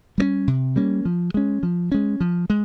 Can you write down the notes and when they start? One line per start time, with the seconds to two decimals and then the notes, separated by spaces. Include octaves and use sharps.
0.18 G3 A#3 C#4
0.47 C3
0.76 G3 A#3 C#4
1.05 F3
1.34 G#3 C#4
1.63 F3
1.92 G#3 C#4
2.20 F3
2.50 G#3